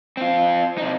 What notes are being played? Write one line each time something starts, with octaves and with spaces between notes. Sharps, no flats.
C4 F4
C3 D#4